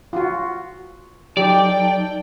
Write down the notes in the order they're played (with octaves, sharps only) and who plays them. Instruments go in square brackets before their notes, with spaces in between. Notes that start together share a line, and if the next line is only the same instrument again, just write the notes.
[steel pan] F4 F#4
[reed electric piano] F#3 D#4 [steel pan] G4 [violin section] A4 G5 [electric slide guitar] D5